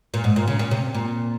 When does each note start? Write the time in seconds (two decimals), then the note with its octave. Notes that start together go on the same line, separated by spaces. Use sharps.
0.14 A#2
0.24 G#2
0.36 A#2
0.47 C#3
0.59 A#2
0.71 C3
0.94 A#2